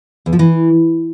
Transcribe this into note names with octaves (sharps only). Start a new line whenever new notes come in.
E2
F3
E3